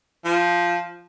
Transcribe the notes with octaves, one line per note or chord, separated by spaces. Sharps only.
F3